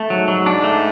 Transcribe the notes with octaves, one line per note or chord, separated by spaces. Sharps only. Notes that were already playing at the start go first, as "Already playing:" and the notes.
Already playing: A3
G#2 F#3
F#3
D4
A3